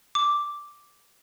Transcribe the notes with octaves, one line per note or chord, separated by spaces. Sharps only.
D6